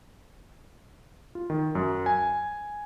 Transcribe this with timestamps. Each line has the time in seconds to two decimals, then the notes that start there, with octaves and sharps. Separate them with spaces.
1.35 F4
1.50 D#3
1.75 F#2
2.06 G#5